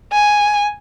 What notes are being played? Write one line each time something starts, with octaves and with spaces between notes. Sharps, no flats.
G#5